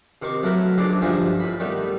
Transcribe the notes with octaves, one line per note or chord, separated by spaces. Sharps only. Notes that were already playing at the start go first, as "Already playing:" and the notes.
C3 D#3 C#6 D6
F#3 A3 E4 A#4 B4
C#2 F#3 D4 C5 D5 D6
G2 D3 F3 D#4 E5 G#5
A2 B5
D#3 G3 A3 B3